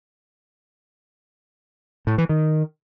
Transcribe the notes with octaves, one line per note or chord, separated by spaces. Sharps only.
A2
E3
D#3